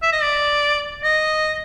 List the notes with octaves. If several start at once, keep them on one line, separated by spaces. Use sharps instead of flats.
E5
D#5
D5
D#5